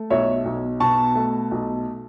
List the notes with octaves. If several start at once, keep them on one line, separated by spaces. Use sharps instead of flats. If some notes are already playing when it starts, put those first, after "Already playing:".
Already playing: A3
B1 C#5 E5
B1
B2 A5 C#6
A3
B1